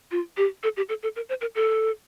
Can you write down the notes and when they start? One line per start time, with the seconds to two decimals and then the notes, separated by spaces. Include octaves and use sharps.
0.11 F4
0.37 G4
0.63 A4
0.77 G4
0.89 A4
1.03 A4
1.16 A#4
1.29 C5
1.41 A#4
1.55 A4